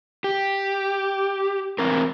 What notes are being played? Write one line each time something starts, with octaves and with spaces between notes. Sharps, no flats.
G4
E2 C4 A#4